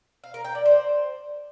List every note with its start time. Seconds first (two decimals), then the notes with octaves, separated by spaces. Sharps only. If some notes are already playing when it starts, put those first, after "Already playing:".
0.24 F5
0.34 A#4
0.45 G5
0.55 D5
0.66 C5